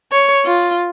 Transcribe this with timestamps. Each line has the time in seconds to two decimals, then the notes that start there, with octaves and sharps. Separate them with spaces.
0.12 C#5
0.45 F4